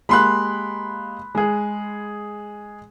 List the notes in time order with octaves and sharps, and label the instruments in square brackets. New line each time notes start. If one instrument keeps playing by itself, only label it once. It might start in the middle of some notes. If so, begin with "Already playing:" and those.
[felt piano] G#3 A#3 G4 [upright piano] B5 C6 F#6
[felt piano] G#3 G#4